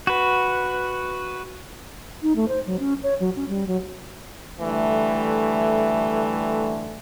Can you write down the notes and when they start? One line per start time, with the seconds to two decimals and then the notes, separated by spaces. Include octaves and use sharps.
0.07 F#4 B4
2.23 D#4
2.36 A3
2.48 C5
2.66 F#3
2.79 C#4
3.03 C#5
3.20 F#3
3.36 C#4
3.49 G3
3.67 F#3
4.60 D3 E3 G3 A3